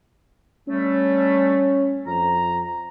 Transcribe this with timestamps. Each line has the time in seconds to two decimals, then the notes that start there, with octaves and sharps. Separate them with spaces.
0.68 G3 A3 C#4
2.07 F2 A#5